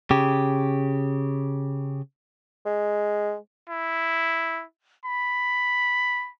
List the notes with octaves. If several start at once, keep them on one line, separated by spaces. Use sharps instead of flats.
C#3 G4
G#3
E4
B5